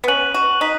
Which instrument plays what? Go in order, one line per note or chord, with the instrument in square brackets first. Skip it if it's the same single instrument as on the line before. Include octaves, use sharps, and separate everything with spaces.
[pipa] B3
[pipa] C#4 [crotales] F#6 D#7 F#7
[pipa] F#4
[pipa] D#4 [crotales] B6 F#7